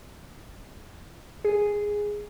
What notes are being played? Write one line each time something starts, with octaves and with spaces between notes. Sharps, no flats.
G#4